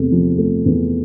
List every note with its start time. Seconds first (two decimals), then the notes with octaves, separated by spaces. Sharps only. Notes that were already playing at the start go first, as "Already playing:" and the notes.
Already playing: E2 C3 A3
0.12 F3
0.38 A3
0.65 E2